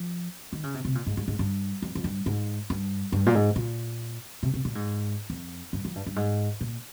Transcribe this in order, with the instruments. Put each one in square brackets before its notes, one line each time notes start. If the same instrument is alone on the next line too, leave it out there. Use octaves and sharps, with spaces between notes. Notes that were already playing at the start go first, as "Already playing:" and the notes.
Already playing: [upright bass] F3
D#3
C#3
C3
C3
A#2
G#2
G#2
G#2
G2
F2
F2
G2
G#2
G2
G2
A#2
G#2
A#2
C3
C3
A#2
G#2
F2
G2
F3
G2
G2
G#2
A#2